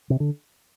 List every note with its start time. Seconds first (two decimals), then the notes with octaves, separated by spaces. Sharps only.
0.10 C3
0.20 D3